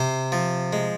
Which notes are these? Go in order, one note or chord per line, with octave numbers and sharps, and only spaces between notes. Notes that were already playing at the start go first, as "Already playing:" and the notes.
Already playing: C3 C5
F3
G#3